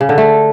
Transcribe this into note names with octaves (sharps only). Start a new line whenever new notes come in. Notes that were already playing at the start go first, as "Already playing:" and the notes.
C#3
D3
A3